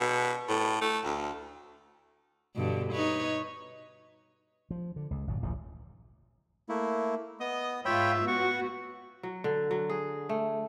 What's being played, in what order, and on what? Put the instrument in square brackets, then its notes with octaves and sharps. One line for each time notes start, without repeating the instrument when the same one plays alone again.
[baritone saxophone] B2
A2
A3
D2
[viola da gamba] G2 B2 D3
D#4 B4 C#5
[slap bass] F3
D3
C#2
G1 A#2 F#3
D1 A1 F3
[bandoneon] A3 A#3 E4
[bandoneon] B3 D#6 [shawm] D#5
[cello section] G#2 F4 [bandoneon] C#5 G5 B5 [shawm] E5
[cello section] B3 F#4 [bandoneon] F#5 [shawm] C#6
[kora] F#3
D3
F#3
G#4
A3